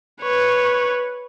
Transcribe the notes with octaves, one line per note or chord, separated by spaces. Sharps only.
B4 C#5